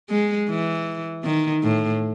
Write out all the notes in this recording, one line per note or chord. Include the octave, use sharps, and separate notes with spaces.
G#3
E3
D#3
A2